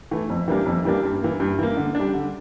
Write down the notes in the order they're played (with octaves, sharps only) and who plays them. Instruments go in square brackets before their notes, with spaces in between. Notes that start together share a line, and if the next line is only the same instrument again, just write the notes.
[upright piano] E3 A3
F2
E3 G3 A#3 D4
F2
E3 G3 A#3 D4
G2
E3 A#3
G2
E3 A#3
D3
G3 D4
D3